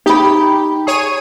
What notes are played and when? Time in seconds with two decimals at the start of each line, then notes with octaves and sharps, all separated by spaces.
0.06 D#4 G4 B5
0.87 G#4 C#5 D#7